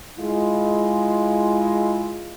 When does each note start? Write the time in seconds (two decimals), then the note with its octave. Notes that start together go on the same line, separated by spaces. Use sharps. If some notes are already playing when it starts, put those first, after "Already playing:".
0.19 G#3 E4 F4